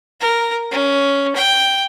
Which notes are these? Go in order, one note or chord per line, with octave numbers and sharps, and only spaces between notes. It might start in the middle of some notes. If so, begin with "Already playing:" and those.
A#4
C#4
G5